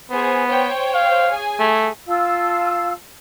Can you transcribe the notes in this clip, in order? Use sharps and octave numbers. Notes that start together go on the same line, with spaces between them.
B3 G#4 C5
C5 C#5 G5
F5
G#4 G#5
A3
F4 F5 A5 E6